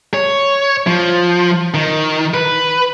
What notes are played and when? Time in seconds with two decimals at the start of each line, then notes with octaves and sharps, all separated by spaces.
0.14 C#5
0.87 F3
1.74 D#3
2.34 B4